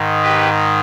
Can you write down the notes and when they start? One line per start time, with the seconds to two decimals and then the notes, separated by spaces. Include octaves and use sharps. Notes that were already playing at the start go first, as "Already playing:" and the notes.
Already playing: G#2 D#3
0.23 G4 B4